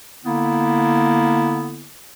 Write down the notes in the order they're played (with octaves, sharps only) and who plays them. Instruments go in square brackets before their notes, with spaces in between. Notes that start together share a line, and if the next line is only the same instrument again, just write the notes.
[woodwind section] D3 A#3 B3 E4